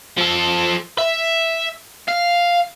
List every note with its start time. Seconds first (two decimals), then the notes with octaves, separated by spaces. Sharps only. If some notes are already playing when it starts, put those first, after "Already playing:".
0.18 F3 A4
0.98 E5
2.09 F5